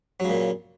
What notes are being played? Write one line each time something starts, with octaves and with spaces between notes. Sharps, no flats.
A#2 C#3 F#3